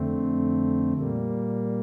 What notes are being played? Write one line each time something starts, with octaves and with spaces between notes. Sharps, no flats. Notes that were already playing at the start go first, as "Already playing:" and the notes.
Already playing: F2 D3 A3 C4
A#2 G3 A#3